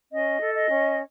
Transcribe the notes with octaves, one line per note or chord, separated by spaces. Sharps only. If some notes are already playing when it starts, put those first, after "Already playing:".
C#4 D#5
A4
D#5
C#4